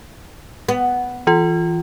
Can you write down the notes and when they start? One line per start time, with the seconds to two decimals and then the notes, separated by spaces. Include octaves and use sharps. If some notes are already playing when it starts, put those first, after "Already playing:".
0.69 B3
1.27 E3 F4